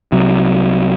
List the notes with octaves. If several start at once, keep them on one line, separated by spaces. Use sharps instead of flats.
C2 C3 F#3